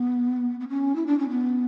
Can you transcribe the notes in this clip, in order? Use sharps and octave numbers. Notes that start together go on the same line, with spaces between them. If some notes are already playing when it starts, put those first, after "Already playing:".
Already playing: B3
B3
C#4
E4
D4
C#4
B3